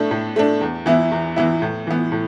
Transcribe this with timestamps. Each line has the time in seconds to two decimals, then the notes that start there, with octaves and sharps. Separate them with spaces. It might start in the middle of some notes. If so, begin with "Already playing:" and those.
Already playing: A2 A3 D4
0.11 A2
0.36 A3 D4
0.61 E2
0.86 E3 B3 E4
1.12 E2
1.36 E3 B3 E4
1.62 A2
1.87 E3 B3
2.12 A2